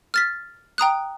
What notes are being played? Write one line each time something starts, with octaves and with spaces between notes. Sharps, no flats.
F6 A6 B6
G5 A#5 D#6 F#6